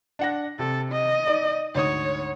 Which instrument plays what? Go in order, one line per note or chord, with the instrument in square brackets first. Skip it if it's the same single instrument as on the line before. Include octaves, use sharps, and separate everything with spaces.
[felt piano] D4 F#5 A#6
[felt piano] C3 [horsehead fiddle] A4
[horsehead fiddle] D#5
[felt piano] D#4 D5
[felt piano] D2 G#2 D#6 [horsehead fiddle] C#5